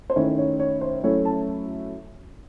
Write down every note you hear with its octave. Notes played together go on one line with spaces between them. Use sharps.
C5
D#3 A3 C#4 E4 C#5
C#5
C#5
C5
F#3 A3 C#4 E4 C#5
A5